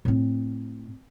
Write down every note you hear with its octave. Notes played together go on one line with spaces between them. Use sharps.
A2 C4